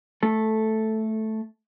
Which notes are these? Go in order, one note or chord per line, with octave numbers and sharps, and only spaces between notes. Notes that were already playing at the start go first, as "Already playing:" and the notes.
A3 A4